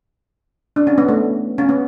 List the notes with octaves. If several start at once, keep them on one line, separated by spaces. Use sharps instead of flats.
D4
C#4
B3
A3
C#4
B3